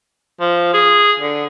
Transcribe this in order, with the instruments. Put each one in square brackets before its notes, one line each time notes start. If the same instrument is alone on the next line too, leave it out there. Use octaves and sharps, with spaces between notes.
[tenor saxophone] F3
G#4
D3